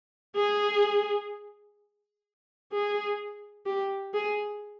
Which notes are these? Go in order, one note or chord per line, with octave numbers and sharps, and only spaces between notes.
G#4
G#4
G4
G#4